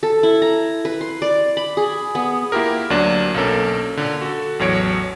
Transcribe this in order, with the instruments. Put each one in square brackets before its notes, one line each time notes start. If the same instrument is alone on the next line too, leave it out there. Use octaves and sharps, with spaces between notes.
[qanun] A4
E4
A#5
B4
C6
D5
B5
G#4
B3
[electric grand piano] A#3 E4 F4 G4 A#4
D2 F#3 A#3 D4 E7
B1 A#3 C#4 A4 A#4
A#2 D3
F#4 A4
A1 E2 F#3 C#5 D7